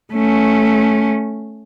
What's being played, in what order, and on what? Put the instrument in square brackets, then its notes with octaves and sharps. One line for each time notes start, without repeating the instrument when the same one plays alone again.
[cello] A3 C#4